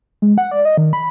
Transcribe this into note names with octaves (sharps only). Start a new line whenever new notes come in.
G#3
F#5
D5
D#5
D#3
B5